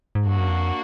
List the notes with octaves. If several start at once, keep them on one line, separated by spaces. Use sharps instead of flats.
G#2
G2 A#3 D4 F#4
F#2
F2